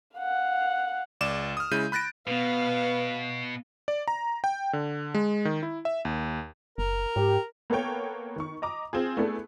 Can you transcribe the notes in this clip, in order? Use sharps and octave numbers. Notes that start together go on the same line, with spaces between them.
F5 F#5
C#2 D5 D6 E7
D#6 F6
C#3 G#3 E4 G6 D#7
B5 F#6 A6 A#6 D7
B2 B3 B4 F5
D5
A#5
G5
D3
G#3
D#3
E4
E5
D#2
F#1 A#4
G#2 G4
A#3 B3 A4 C#5 G5
D#3 C#6
D#5 A#5 D6
C4 F4 G#4
A3 B3 D4 E4 G#4 A4